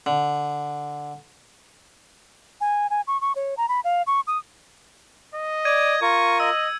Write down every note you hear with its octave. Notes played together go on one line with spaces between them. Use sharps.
D3
G#5
G#5
C#6
C#6
C#5
A#5
B5
F5
C#6
D#6
D#5
D5 G#6 D#7
F4 A#4 C#6
D#5 E6